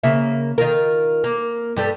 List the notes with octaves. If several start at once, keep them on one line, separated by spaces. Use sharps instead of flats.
C#3 A#3 E5
D#3 F4 A#4
A#3
G2 G3 A3